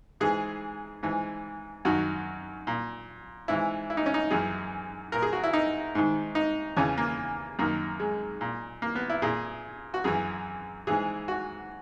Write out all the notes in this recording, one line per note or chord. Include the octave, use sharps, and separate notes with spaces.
G#2 E3 G#4
G#2 E3
F#2 D#3 F#4
A#2
G#2 E3 E4
E4
D#4
C#4
D#4
F#2 E3 G#4
A#2 A#4
G#4
F#4
E4
D#4
G#2 D#3
D#4
E2 C#3 E3 C#4
A#3
F#2 D#3 A#3
G#3
A#2
A#3
B3
E4
A#2 G#4
F#4
F#2 E3 G#4
G#2 E3 G#4
F#4